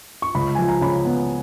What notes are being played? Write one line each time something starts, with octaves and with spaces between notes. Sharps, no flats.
C#6
C#2 B5
F3 G#5
A#5
C#3 B5
B3